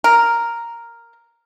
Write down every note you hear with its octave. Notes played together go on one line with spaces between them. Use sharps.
A#4